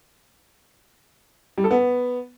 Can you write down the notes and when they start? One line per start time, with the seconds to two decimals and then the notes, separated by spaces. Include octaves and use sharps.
1.58 G3
1.64 A4
1.71 B3